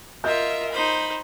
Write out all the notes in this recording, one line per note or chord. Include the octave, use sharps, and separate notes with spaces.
F4 A#4 D#5 E5 G6
D#4 C5 B5